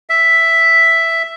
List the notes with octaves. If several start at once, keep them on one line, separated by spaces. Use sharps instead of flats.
E5